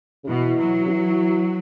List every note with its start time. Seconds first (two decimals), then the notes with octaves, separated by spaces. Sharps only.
0.24 C#3
0.28 B2 E3
0.59 F#3
0.86 C#3
0.90 E3